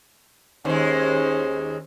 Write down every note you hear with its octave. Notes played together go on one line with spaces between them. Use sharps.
D#2 G#3 C#4 C5